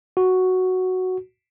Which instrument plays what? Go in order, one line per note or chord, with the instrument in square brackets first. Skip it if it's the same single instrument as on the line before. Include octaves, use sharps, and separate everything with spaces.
[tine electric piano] F#4